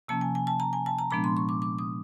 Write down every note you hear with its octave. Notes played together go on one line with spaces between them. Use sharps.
C3 F3 A#3 C#4 A5
G#5
G#5
A5
A#5
G#5
A5
A#5
A#2 F3 G#3 B3 D4 B5
C6
C#6
D6
D6
D#6